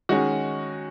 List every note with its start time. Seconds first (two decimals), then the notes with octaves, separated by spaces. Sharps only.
0.09 D#3 G#3 C#4 F#4